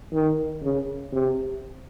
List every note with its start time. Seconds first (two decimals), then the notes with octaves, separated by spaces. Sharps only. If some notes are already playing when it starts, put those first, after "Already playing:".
0.13 D#3
0.62 C#3
1.12 C3